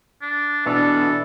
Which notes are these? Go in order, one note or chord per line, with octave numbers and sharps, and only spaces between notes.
D4
B2 E3 D4 A4